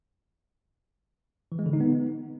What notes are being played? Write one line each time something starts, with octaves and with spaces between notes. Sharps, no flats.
E3
G#3
D3
D#4
B3